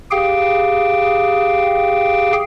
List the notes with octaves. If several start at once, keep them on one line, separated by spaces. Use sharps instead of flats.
G4 G#4 F5 G5